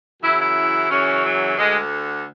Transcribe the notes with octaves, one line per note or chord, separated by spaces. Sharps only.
F#2 C#3 E3 E4
E4
F#2 C#3 E3 C#4
F#3
D2 D3 G#3